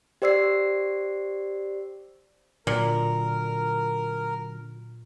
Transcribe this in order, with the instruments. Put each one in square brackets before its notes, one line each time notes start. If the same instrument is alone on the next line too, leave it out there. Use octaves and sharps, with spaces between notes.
[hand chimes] G4 C5 D5 E6 C7
[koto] A#2 [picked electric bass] D3 F#3 [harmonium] A#4